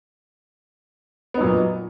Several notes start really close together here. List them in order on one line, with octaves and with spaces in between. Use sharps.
B3 D#4 F#3 A#2